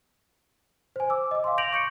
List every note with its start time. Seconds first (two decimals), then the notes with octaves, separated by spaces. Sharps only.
0.96 C5 G#5
1.10 D6 E6
1.31 D#5 D6
1.44 F5 C6
1.58 G6 A#6 D7 F7 F#7
1.73 C#6 G6 C#7